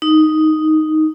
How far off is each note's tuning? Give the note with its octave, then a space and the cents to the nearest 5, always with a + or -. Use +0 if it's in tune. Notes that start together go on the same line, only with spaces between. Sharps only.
D#4 +0